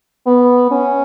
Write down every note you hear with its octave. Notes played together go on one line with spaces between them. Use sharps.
B3
C#4